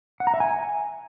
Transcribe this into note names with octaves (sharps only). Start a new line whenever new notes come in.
F#5
A#5
E5
G#5